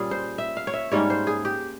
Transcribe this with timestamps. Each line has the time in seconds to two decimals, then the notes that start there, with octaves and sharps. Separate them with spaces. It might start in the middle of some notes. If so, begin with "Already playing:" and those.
Already playing: A#2 G3 C#4 G#4
0.11 C5
0.38 E5
0.57 F5
0.67 C#5
0.74 E5
0.92 G#2 G3 A#3 C#4 C#5
1.10 C5
1.27 G#4
1.45 G4